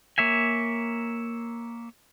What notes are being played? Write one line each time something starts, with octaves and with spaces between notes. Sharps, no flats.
A#3 C#5 E5 G#5